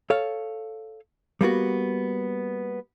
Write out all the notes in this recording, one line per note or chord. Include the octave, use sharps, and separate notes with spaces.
A4 C#5 F5
G3 A#3 B3 F#4